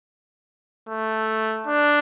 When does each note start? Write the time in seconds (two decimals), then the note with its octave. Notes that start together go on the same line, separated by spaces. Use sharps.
0.89 A3
1.67 D4